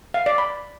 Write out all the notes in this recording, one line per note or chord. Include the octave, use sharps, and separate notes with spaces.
F5
D5
B5